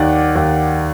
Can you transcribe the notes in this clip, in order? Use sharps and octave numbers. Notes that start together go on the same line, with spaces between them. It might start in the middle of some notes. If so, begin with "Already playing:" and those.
Already playing: D#2 D#3 D5 F#5
D#2